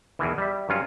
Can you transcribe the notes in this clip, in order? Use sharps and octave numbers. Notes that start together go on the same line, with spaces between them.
E2 B2 D#3 E3
G3 E5
G2 F#3 C#4 F4